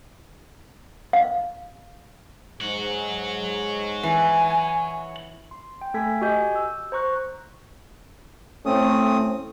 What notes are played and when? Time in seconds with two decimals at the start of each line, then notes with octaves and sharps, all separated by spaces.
1.13 F5
2.61 G#2 C#5 F#5
4.03 E3 E4 G#5
5.51 C6
5.82 G5
5.94 A3 A4 G#5 G#6 B6
6.22 F#4 G4 D#5 G#5 G6
6.55 E6
6.92 C5 A#5 C#6 F#6
8.66 A2 A3 C4 C#4 D#6